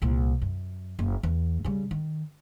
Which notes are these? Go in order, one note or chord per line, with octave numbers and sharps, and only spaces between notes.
C2 A#2
F#2
F#1
E2
C#3 G3
D#3